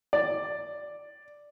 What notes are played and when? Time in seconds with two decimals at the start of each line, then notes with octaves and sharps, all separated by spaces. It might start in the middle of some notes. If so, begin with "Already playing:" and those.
0.13 D5